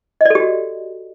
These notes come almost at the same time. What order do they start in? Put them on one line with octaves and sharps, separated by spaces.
D#5 D5 A4 G4 F#4